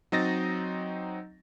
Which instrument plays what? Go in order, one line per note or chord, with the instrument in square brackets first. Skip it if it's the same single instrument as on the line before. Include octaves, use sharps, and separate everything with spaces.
[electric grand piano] F#3 C4 D#4 D#5 A6 A#6